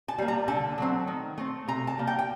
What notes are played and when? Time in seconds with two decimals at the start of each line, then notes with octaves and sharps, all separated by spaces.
0.08 A5
0.18 G3 A#3
0.28 A#5
0.48 D3 A5
0.78 F#3 A3 C4
1.07 D#3
1.38 A3 C4
1.68 C3 A#5
1.87 A5
1.97 G3 A#3
2.07 G5
2.19 G5